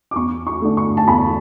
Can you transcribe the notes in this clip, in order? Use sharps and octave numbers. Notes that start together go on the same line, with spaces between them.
D6
E2 C#6
C#6
D3 A3
C#6
A5
E2 B5